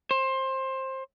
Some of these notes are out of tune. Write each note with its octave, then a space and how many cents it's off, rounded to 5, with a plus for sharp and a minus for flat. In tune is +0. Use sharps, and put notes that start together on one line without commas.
C5 +20